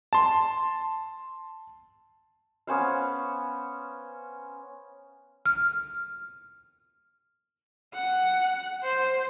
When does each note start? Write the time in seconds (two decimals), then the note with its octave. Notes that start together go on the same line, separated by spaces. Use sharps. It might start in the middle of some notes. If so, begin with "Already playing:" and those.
0.13 A5 C6
2.67 B3 C#4 C5 F5
5.45 F6
7.95 F#5
8.83 C5